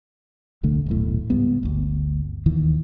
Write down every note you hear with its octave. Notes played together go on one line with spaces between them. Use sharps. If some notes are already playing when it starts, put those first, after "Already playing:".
D#1 C2 D3 A3
D#1 B1 A2
C#2 G#2 G3 B3
G1 D2
D1 D#2 D#3 E3